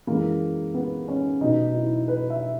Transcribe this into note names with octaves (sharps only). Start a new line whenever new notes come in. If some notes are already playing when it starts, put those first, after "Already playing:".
F#2 E3 G#3 A#3
B3
C#4
B2 F#3 D#4
E4
B4
E5